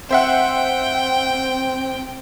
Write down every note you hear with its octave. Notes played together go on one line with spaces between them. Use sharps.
C4 C5 E5 F#5 G5